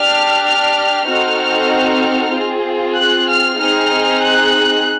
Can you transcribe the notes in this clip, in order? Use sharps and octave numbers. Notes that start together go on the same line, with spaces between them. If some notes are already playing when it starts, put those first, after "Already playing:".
Already playing: D4 G4 F6
F6
C4 D#4 F#4 A4 F6
C4 F4 G#4
F#6
F6
C4 D#4 G#4 F6
F#6